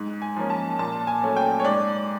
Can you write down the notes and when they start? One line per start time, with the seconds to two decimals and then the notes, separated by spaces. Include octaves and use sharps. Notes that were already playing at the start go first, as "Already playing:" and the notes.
Already playing: G#2
0.22 G#5
0.36 F3 A#3 C#4
0.50 A5
0.79 A#2 A5
1.07 G#5
1.23 F#3 A3 C#4
1.37 G5
1.60 C#5
1.65 G#2 D5